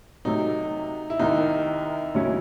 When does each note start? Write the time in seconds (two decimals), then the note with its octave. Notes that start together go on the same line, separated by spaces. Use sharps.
0.25 C3 F#3 A3 D#4
1.10 E4
1.19 C2 C3 D#3 D#4
2.14 D#2 C#3 F#3 C#4 E4